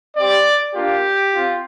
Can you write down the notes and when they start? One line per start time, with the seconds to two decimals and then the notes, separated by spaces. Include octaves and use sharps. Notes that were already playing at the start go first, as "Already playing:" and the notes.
0.17 C4 G4 D5
0.75 A#3 D4 F4 G4
1.34 C4 F4